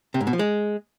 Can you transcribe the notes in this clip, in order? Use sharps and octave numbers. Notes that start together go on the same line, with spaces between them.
C3
G#2
B2
F3
G#3